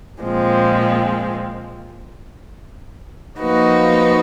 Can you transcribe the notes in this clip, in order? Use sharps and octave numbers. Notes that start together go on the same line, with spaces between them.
A#2 F3 G#3 C4
F3 A#3 D#4 F#4 B4